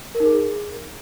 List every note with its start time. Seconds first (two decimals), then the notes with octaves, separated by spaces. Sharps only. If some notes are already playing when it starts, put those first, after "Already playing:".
0.15 A#4
0.20 D#4
0.25 G#4